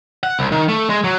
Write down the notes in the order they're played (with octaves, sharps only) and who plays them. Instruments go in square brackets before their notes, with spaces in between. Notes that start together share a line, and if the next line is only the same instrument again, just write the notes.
[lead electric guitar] F#5
C2
D#3
A3
G#3
F#3